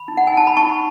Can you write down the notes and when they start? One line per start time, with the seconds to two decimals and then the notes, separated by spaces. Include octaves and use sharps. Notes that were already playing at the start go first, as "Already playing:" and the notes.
Already playing: B5
0.08 D#4
0.17 F#5
0.27 G#5
0.32 D#4 A5
0.47 B5
0.57 D#4 A5 C#6